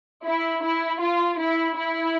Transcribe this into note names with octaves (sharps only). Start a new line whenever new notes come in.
E4
E4
F4
E4
E4